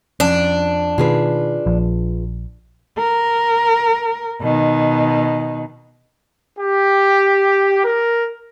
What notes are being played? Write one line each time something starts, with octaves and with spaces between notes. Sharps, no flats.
F2 C#4 D4
B2 D#3 F4 G#4 B4
A#1 F3
A#4
B2 D#3
G4
A#4